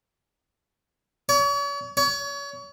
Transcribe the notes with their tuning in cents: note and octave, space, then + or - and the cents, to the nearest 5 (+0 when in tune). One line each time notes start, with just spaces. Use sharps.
C#5 +40
C#5 +30